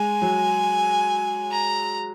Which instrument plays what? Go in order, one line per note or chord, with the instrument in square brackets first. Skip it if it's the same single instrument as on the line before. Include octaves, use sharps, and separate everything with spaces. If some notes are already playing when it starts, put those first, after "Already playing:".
Already playing: [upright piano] G#3 [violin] G#5
[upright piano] F#3
[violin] A#5